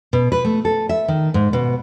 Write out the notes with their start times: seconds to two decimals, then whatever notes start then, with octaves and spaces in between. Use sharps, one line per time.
0.13 B2
0.32 B4
0.45 A3
0.65 A4
0.89 E5
1.08 D#3
1.34 G#2
1.53 B2